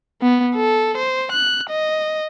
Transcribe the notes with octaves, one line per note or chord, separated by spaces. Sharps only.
B3
A4
C5
F#6
D#5